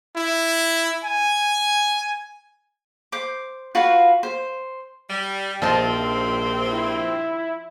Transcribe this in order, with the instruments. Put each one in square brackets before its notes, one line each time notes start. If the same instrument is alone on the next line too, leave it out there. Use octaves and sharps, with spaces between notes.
[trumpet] E4
G#5
[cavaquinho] C5 D6
F4 F#4 B4 F5
C5
[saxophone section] G3
[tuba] A#1 [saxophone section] G2 C3 C4 [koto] F3 D#4 A5
[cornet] E4